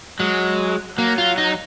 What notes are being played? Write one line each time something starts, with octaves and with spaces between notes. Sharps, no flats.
F#3 G#3
F#3 A#3
F4
D#4